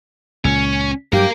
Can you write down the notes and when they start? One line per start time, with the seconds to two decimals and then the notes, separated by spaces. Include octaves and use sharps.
0.45 C#2 A#2 C#4
1.13 G2 F#3 G4 A#4 F5